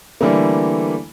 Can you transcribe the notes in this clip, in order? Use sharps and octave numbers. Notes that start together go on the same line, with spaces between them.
D3 E3 G3 A3 A#3